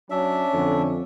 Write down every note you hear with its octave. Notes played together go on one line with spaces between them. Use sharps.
F#3 C#4 D4 E5
F2 D3